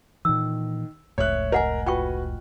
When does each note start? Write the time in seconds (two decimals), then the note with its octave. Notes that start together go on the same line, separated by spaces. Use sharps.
0.25 A#2 D#3 E3 E6
1.18 F1 C#2 A2 C#5 E5 F#6
1.52 A#4 D#5 F#5 G#5
1.86 F4 F#4 B4 G5 C#6